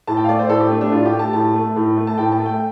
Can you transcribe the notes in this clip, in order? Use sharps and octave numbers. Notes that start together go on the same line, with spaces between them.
A2 A5
G5
F5
A3 D5
C5
A2 A4
G4
A3 D4
D4
A2 F4
G4
A3
A5
A2 A5
A3
A2
A3
A5
A2 G5
A5
A3
G5